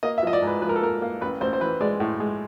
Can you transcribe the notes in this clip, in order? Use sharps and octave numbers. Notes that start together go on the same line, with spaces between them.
A#3 D#5
E5
F3 D#5
D5
G#2 B4
F3 B4
A#4
A4
A#3 A#4
A#3
A1 B4
A1 C5
C5
E3 B4
G#3 D5
A2
G#3